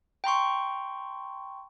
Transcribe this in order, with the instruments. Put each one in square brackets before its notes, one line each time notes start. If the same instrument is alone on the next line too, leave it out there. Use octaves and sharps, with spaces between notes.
[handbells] G5 A#5 C6 C#6